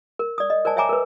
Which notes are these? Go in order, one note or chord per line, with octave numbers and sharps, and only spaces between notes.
A#4
D5 D#6
D#5
A#4 C5 D5 G#5 A5
C#5 E5 G5 G#5 A#5 D6
A#4 B4